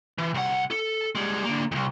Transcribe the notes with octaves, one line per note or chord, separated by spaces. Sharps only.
E3
C2 F#5
A4
G3 G#3
D3 A#3
C2 F2